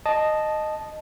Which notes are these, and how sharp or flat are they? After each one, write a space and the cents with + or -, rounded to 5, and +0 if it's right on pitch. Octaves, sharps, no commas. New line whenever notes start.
D#5 -10 A5 -10